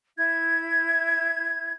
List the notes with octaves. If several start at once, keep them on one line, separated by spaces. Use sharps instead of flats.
E4 G#6